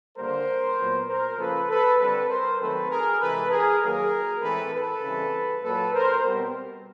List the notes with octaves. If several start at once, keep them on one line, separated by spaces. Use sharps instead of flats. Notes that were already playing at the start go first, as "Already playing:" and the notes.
D3 G3 A#3 A#4 C5
A#2 F#3 B3
A#4 C5
C#3 F3 A#3 A4 B4
A4 B4
D3 G3 C4 A4 B4
A#4 C5
D#3 F#3 A3 C4 A4 B4
G#4 A#4
C3 E3 G#3 A4 B4
G#4 A#4
D#3 F#3 A#3 G#4 A#4
A2 E3 G#3 C4 A4 B4
A4 B4
C#3 E3 G3 C4
A#2 F#3 A#3 A4 B4
A#4 C5
B2 G3 C4